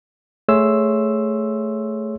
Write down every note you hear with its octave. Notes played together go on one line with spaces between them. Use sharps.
A3 G#4 C#5 E5 C6 E6